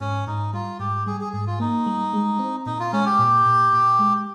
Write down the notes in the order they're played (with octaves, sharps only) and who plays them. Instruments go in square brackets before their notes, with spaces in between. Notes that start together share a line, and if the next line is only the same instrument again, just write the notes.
[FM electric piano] G#2 [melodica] C#4
[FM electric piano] G#2 [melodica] D#4
[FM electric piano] G3 [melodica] F4
[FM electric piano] G#2 [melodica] G4
[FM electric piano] G3 [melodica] G#4
[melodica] G#4
[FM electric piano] G#2 [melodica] G#4
[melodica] F4
[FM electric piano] A#3 [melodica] D#4
[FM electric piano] G3
G#3
C4
[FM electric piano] A#2 [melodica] D#4
[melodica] F4
[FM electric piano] G#3 [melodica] C#4
[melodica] G4
[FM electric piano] A#2
A#2
A#2
G#3